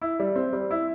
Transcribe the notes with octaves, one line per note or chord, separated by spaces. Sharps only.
E4
G3
C4
G3
E4